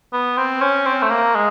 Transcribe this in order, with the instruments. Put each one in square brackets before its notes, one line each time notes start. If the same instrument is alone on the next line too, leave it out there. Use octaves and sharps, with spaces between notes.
[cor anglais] B3
C4
C#4
C4
A3
A#3
G#3